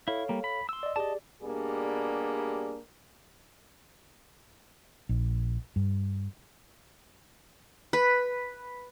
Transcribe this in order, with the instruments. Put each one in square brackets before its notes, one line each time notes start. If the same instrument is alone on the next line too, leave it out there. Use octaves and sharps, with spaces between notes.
[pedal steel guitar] E4 [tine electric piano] A4 C#5 F5
[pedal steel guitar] G3 A#3
B5
C6 E6
[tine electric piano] D5 D#5
[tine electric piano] G4 G#4 D5 [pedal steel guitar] D#5 A5
[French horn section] B2 G3 A#3 D4 G4 G#4
[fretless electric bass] A#1
G2
[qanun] B4